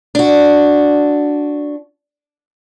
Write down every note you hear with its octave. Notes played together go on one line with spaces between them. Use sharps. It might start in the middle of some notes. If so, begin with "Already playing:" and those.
D4 F#4